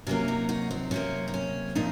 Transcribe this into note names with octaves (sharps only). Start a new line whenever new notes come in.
C3 F#3 A#3 C#4
D#4 F#4
D#4 F#4
C4 D#4
C3 F#3 A#3 C#4
D#4
C#4
A#2 F3 A#3 C4 D#4